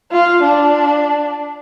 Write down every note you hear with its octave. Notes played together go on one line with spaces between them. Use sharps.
F4
D4